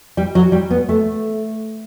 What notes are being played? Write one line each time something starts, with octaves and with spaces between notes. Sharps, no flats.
G3
F#3
G3
B3
A3